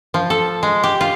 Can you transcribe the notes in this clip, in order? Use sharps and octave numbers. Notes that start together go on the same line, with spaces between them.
F3
A4
G#3
G4
F4